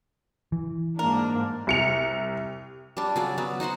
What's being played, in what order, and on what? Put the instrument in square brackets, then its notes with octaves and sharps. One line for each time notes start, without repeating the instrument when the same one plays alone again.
[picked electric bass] E3
[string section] G#2 A#3 D4 [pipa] A#4
[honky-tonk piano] C2 C#7 F7
[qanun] G3 D4
C#3 F#3 D5
F#3 B3
D#4 F#4 C5 F#5